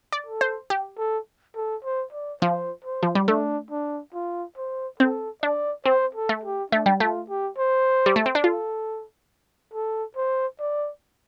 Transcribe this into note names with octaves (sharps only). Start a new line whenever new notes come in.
D5
A4
C5
G4
A4
A4
C5
D5
F3 C5
C5
F3
G3
A3 D4
D4
F4
C5
C4 A4
D4 D5
C4 C5
A4
A3
G4
A3 D4
G3
A3 F4
G4
C5
G3
A3
C4
D4
F4 A4
A4
C5
D5